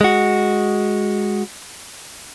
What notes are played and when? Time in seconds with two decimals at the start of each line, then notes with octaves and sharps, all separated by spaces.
0.01 G#3 F#4